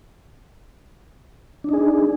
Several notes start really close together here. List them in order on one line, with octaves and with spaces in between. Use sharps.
D4 D#4 G#4